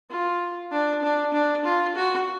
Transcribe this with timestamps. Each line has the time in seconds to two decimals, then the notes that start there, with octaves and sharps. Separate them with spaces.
0.11 F4
0.71 D4
1.03 D4
1.34 D4
1.65 F4
1.95 F#4